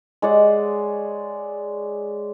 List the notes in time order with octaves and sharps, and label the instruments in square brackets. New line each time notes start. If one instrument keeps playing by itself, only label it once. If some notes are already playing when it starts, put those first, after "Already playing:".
[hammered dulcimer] G#3 C#5 D5 F#5